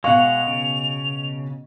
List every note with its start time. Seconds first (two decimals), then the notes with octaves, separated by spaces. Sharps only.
0.04 B2 G#3 F5 F#5 C#6 F7
0.47 C#3